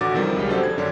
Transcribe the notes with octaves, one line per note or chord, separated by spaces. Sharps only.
A1 D3 F#4 D6 A6
C3 D#3 F3 G3
C#2 C#3 G3
F3 F#3 D4 G4 A4 C5
G#6
F#2 D3 C#4 D4